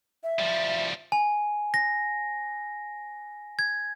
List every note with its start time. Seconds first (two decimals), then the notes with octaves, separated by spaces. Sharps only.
0.23 E5
0.39 F3 G3
1.12 G#5
1.74 A#6
3.59 G#6